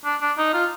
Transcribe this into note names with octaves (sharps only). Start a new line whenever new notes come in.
D4
D4
D#4
F4